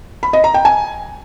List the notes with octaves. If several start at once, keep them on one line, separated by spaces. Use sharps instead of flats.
B5
D#5
A#5
G5
G#5